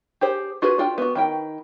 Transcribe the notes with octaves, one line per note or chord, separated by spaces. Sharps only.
G4 G#4 C5
F4 F#4 G#4 B4
D4 F4 G5
B3 F#4
D#3 E4 G5